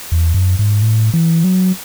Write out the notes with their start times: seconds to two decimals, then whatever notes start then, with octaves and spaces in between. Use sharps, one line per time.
0.12 E2
0.34 F#2
0.59 G#2
0.82 A2
1.14 E3
1.44 F#3